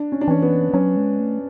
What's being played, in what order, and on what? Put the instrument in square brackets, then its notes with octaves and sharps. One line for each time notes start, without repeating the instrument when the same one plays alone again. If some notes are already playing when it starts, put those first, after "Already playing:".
Already playing: [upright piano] D4
C#4
D4
[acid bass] E3 [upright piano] C#4
[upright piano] B3
[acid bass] F#3 [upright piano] C#4
[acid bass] G#3
A3